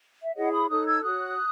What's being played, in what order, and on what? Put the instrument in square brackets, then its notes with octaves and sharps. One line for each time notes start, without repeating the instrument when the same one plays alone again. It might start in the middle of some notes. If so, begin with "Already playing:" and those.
[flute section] E5
E4 G#4 C#5 D#5 F#5
B5 D#6
D#4 A4 C#5 D#6 F#6
E6 G#6
F#4 C#5 D#6 F#6